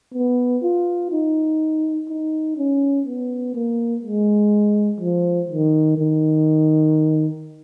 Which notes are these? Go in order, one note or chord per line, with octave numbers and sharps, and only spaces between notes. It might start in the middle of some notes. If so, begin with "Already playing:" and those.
B3
F4
D#4
D#4
C#4
B3
A#3
G#3
F3
D#3
D#3